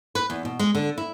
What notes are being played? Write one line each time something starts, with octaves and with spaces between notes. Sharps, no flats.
B4
E2
B2
G#3
D3
E4